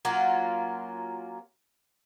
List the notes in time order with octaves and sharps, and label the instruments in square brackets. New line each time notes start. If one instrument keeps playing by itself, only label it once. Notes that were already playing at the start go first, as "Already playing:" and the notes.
[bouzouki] F#3 A#3 C#4 F4